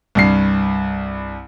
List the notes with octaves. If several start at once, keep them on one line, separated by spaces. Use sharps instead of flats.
C2 G2 C7